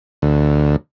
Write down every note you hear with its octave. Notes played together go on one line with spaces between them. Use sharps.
D2